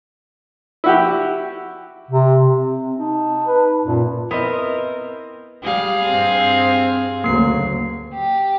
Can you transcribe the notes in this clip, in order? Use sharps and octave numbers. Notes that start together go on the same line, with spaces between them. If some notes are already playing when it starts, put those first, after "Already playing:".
E4 F#4 G4
C3
C4
D#4 A5
B4
F#2 A#2
B3 C4 E4 A#4 D#5
G3 G#4 F5
G2 C4
D2 C#3 F#3 A#3 C7
G4